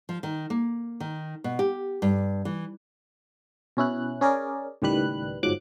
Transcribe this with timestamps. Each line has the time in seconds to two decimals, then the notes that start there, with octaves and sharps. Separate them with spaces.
0.09 F3
0.23 D#3
0.50 A#3
1.00 D#3
1.44 B2
1.59 G4
2.02 G2
2.45 E3
3.77 B2 C#4 E4 F#6
4.21 C#4 G#4 A#4 D5
4.82 C#2 A2 D#3 G3 B4 F#6
5.43 G1 G#2 F3 F#3 D6 F#6